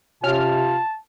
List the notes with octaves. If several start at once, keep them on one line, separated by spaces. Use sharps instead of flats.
C3 C#4 F4 A5 F6